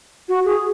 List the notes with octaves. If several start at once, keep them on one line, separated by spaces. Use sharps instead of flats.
F#4
G#4